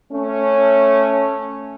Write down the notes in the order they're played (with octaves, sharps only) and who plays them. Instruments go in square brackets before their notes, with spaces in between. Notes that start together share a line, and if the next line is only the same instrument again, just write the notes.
[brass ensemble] A3 C#4